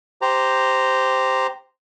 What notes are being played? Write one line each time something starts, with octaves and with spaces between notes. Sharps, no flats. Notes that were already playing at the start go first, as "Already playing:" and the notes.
G4 C5 A#5